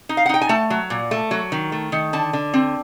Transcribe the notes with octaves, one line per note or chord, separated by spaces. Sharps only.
D#4
F5
F#5
D#4 G5
G#5
A3 A5
F#3
A#2
A3
F#3
D#3
A3
D#3
D3 A5
D3
C4